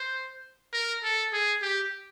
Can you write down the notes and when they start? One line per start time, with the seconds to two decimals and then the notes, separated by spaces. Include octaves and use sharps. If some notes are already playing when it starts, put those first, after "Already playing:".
Already playing: C5
0.73 A#4
1.04 A4
1.33 G#4
1.62 G4